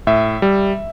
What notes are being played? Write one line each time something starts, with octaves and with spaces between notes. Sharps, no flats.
A2 E5
G3